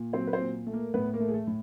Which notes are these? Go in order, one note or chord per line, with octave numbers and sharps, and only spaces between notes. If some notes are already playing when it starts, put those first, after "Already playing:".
Already playing: A#2
F#3 C4 C5
B4
C4 C5
A#2
A3
A#3 A#4
A2 B3 B4
A#3 A#4
A3
G#4
A3 A4
A2